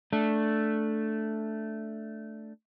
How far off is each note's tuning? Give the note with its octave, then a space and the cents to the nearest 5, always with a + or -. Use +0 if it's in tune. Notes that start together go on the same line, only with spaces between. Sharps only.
A3 +0 D4 +0